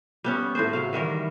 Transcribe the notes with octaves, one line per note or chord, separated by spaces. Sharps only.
G3 B3 C#4
A2 C4 G#4 C5
C#3 F#3 F5
D#3 E3 G3 A#4